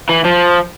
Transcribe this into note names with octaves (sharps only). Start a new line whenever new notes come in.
E3
F3